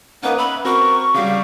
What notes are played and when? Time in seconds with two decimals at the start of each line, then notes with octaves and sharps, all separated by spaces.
0.23 A#3 B3 C#4 D#4 B4
0.38 B4 E5 B5
0.65 C4 F#4 A#4 C#6
1.14 C#3 G3 F#4 F5 D6